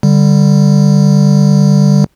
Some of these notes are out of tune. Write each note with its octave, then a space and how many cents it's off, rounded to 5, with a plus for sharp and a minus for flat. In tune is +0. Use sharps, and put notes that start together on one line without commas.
D3 +0 G3 +0